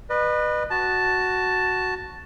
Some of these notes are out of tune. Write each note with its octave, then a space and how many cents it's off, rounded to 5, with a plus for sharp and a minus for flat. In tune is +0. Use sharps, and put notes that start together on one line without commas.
B4 -5 D#5 -45
F#4 +0 A5 +0